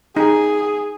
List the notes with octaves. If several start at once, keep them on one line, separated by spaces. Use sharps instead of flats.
D#4 G#4